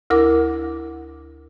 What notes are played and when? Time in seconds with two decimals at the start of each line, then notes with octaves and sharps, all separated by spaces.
0.10 D2 E4 A#4 D6